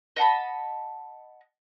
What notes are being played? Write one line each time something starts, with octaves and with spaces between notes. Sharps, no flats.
D#5 F#5 A5 B5